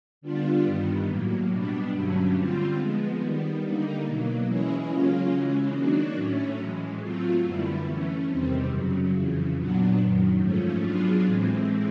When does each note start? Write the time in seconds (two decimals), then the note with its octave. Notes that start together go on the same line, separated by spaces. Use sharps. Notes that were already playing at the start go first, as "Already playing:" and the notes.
0.21 D3 G3 B3 D4 F4
0.64 G2 D#3 G3 B3
1.06 A2 F#3 A#3
1.49 B2 G3 B3 D4
1.91 G2 D3 F#3 A3 C#4
2.33 D3 G3 C4 F4
2.76 F3 G#3 B3
3.19 D#3 G3 B3
3.60 D3 G3 A#3 D#4
4.03 B2 F#3 A#3
4.45 E3 G#3 C#4 E4 G#4
4.88 C#3 F#3 A#3 C#4 F4
5.30 C#3 E3 G#3 C#4
5.73 D#3 F#3 A#3 D4 F#4
6.15 A2 F#3 A3 C#4
6.57 A2 E3 G#3
7.00 F#3 A3 C4 F4
7.43 F#2 D3 G3 B3 E4
7.85 E3 A3 C#4
8.27 E2 C3 D#3 G3 C4
8.70 F#2 C#3 F#3
9.11 F2 C#3 E3
9.54 A#2 F#3 B3 D4
9.97 F#2 D#3 F#3
10.39 G#2 F3 A3 C#4
10.82 F#3 B3 D4 F4 G#4
11.24 A2 E3 G#3 C4